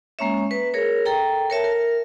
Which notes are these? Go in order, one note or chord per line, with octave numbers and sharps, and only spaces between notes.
G#3 A#3 C#4 C#5 E5
B4
G#4 A#4 C#5
A4 G5 A#5
A#4 C#5 E5 A5
A#4